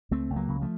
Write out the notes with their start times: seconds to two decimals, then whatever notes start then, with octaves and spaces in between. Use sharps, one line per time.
0.11 C#2 A3 C4
0.30 C#2
0.36 F#3 A#3
0.48 C#3
0.61 F3 A3